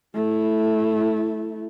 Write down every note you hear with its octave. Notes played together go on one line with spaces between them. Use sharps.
A3 E4